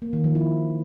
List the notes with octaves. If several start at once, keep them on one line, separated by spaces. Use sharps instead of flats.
A#3
D#3
F3
E4